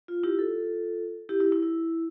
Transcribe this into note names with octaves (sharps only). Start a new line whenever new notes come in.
F4
E4 G4
F4 A4
E4 G4
E4
E4
E4